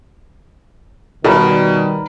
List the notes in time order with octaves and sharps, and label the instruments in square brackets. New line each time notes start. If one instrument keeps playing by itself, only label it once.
[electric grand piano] B2 [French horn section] D#3 G3 [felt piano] A#4 B4 A#5